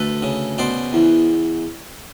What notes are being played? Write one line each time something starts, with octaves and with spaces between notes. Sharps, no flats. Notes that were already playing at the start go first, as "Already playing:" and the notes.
Already playing: D2 A4 B4
C#3
B2 C5 D5
E2